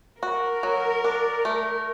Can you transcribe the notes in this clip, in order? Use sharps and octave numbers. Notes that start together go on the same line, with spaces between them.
F#4 A#4
F#3
D4
A3